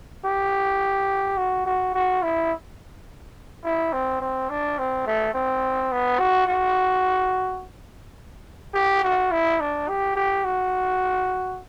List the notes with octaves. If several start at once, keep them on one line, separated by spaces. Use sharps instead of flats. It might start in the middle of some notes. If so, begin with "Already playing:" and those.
G4
F#4
F#4
F#4
E4
E4
C4
C4
D4
C4
A3
C4
B3
F#4
F#4
G4
F#4
E4
D4
G4
G4
F#4